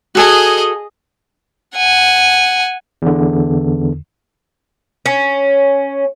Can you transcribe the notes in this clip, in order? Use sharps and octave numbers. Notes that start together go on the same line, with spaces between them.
F#4 G#4 A4 D#5 G#5
F#5 G#5
E2 D3
C#4